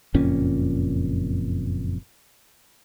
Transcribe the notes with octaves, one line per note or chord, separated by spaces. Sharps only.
F#1 F2 A#2 C#4